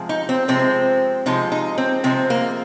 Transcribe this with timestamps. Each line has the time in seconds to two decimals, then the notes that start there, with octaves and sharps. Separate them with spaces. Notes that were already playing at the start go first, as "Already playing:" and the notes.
Already playing: C3 F3 G#3
0.09 D#4
0.29 C4
0.48 C3 F3 G#3 C4
1.26 C3 F3 G#3 D#4
1.52 D#4
1.78 C4
2.04 C3 F3 G#3 C4
2.30 A#3